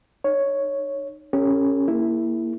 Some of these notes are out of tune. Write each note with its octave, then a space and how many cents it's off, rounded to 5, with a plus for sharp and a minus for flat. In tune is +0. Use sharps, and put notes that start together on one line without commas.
D#4 -35 C#5 +0
C#4 +0 G4 +20 A#4 -45
A#3 +0 E4 +0 G#4 -25